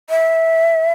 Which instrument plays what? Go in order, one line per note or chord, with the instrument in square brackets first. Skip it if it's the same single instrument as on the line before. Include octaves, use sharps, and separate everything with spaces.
[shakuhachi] E5